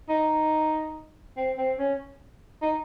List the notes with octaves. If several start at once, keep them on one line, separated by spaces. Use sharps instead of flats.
D#4
C4
C4
C#4
D#4